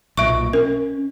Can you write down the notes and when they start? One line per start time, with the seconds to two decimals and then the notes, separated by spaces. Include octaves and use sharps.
0.17 B1 A#2 E5 C#6
0.53 C#4 A#4